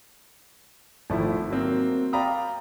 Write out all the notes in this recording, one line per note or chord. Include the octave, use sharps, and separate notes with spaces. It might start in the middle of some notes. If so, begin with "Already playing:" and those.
G#1 F3 A3 E4
F#3 A#3 C4 C5
D5 F5 G5 A#5 B5 D#6